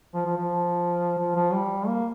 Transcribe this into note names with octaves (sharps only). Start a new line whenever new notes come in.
F3
F3
F3
F3
F3
G3
A#3